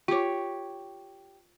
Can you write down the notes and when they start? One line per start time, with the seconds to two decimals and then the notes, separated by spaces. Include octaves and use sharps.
0.08 F4 G4 C#5 D6